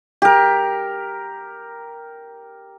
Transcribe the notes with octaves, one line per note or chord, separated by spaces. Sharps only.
G4 A#4